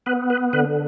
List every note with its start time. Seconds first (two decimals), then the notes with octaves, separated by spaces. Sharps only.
0.06 B3 B4
0.30 B4
0.53 D3 B4